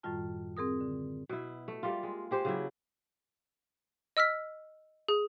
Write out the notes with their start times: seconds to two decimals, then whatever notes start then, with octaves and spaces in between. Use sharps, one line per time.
0.03 F#2 A2 D#3 G3 F4 A5
0.57 C4 G#4 A#4 D#6
0.81 D3
1.29 B2 E4
1.68 A3
1.83 G3 A#3 F4
2.03 G#3
2.31 G#3 G4 C5
2.45 C#3 F#3 E4
4.17 D#5 E6 F6 B6
5.08 G#4